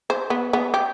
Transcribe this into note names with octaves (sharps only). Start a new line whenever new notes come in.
C5
B3
B3
G4